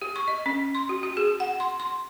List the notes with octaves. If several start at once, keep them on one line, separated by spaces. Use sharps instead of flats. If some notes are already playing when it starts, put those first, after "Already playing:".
G4
C#6
D#5
C#4
C6
F#4
F#4
G#4
F#5
C6
C6